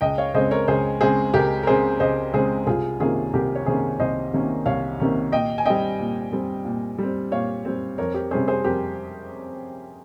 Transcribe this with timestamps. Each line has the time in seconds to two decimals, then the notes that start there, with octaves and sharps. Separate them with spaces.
0.01 C#2 D#5 G5
0.18 C#5 F5
0.34 C#3 G#3 C4 C5 D#5
0.51 A#4 C#5
0.68 C#2 G#4 C5
1.01 C#3 G#3 C4 G#4 C5
1.34 C#2 G4 A#4
1.63 A#4
1.67 C#3 G#3 C4 G#4 C5
2.00 C#2 C5 D#5
2.34 C#3 G#3 C4 G#4 C5
2.67 C2 F4 G#4
3.00 C3 D#3 A#3 C#4 F4 G#4
3.33 C2 G4 A#4
3.55 C#5
3.66 C3 D#3 A#3 C#4 G#4 C5
4.00 C2 C5 D#5
4.33 C3 D#3 A#3 C#4
4.66 C2 C#5 F5
5.00 C3 D#3 A#3 C#4
5.32 A#2 D#5 G5
5.58 G#5
5.65 G3 C4 D#5 G5
5.99 A#2
6.32 G3 C4
6.65 A#2
6.98 G3 C4
7.32 A#2 C#5 F5
7.65 G3 C4
7.98 F2 A#4 C#5
8.14 G4 A#4
8.31 C3 G3 C#4 G#4 C5
8.48 G#4 C5
8.64 F2 G4 A#4